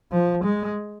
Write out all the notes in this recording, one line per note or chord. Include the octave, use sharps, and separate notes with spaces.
F3
G#3